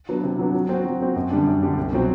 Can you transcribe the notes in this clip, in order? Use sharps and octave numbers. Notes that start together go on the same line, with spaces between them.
F#3 B3 D4
C3
F#3 B3 D4
F#3
C4 F#4
F#3
C4 F#4
F#2
D3 G3 D4
F#2
D3 G3 D4
C2
B2 F#3 C4